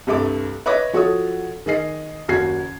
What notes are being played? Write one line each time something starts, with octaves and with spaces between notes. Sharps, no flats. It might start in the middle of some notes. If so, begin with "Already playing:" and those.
C2 G2 A3 D6
B4 C#5 D#5 E5 D6 A#6
F3 F#4 A4 C#5 D#6
D#3 G#4 D#5 C7
F#1 D#2 F#4 G#6 C7